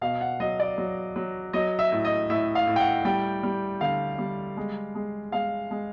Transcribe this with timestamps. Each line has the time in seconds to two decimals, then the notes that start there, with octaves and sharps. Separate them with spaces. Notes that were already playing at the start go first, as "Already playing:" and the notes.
0.01 B2 F5
0.21 F#5
0.40 F#3 D#5
0.60 D5
0.78 F#3
1.16 F#3
1.53 F#3 D#5
1.79 E5
1.92 A2
2.05 D#5
2.30 A2 E5
2.55 F5
2.67 A2
2.76 G5
2.80 F#5
3.05 G3 G5
3.43 G3
3.81 D3 F5
4.18 G3
4.57 G#3
4.95 G#3
5.32 G#3 F5
5.71 G#3